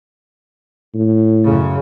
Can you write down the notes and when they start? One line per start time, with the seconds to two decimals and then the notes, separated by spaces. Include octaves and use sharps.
0.94 A2
1.44 F#2 C#3